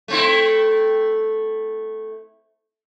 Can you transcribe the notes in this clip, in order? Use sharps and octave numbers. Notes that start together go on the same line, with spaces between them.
A3 C4 E4